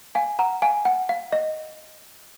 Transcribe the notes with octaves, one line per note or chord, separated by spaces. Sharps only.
F5 G#5
F#5 A#5
F5 G#5
F#5
F5
D#5